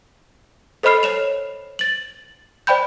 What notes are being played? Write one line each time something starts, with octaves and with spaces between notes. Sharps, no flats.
A4 C5 D#5 B5 F6 C7
C#5 E7 F7
A6 F#7
C5 D5 G5 B5 G6